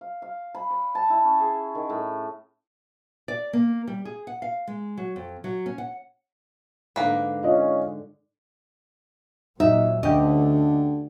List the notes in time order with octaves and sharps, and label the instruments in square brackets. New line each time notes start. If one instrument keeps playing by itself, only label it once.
[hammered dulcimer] F5
F5
B5
D5
A5
E4
C#4
G#4
D#3
A2
[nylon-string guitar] D5
A#3
G3
G#4
F#5
F5
G#3
F#3
F2
F#3
C#4
F#5
[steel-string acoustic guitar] G#2 D3 [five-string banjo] A#3 B4
[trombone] C#4 [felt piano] F4 D#5
[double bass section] A#2 F#3 [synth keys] D#4 [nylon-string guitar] E5
[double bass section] D2 A3 [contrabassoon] D3 [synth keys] C#4 G4 [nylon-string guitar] D#5